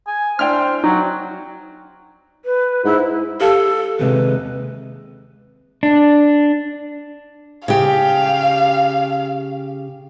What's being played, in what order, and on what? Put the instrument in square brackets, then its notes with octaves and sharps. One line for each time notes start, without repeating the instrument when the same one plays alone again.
[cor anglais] G#5
[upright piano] D4 E4 G5 [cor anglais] C5 [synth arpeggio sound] F6
[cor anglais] F#3 [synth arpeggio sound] D#4
[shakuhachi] B4
[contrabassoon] G#2 [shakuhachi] E4
[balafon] G4 F5 A5 [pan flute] A4
[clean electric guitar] D#2 C3 G#3 [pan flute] B4
[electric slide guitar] D4
[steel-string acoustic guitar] C#3 G4 [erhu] F5